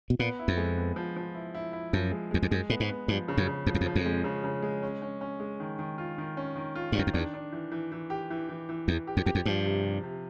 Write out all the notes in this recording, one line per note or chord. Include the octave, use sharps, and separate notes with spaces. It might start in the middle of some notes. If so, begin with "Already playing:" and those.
B2
A#2 B3
E4
F2
G#3
B3
F3
F3
E4
E4
E4
F#2 F3
G#3
E2 G#3
F2
F#2 G#3
A2 B3
G#2
B3
G2 F3
C#3
F#2
C#3
F2 F3
E2
F2
F3
F2
G#3
C#3
C#3
G#3
C#4
C#4
C#4
G#3
D#3
D#3
F4
D#3
C#4
D#3
F4
G2
F#2 D#3
F2
E2 D4
D4
E3
E3
E3
G4
E3
E3
E3
E2 E3
G4
F2
E2 G4
F2
G2 F3
C3
C3
C3